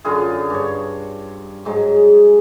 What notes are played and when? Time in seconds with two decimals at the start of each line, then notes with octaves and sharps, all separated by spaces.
0.04 F#2 D3 F4 G#4
0.50 G2 C#5
1.65 G#2 F#3 G#3